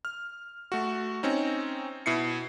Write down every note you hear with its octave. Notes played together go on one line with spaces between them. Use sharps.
F6
A3 F#4
C4 C#4 D#4
B2 E4 C7 C#7